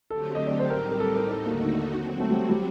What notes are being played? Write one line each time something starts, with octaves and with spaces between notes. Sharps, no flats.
D3 F#3 A3 C4 G4 A4
D#5
D5
C5
A2 G3 C4 D#4 G4 A#4
A#4
A4
A#4
D#2 D3 A3 D#4 F#4 A4
A#3
F#3 C4 F#4
A3
G3
F#3
G3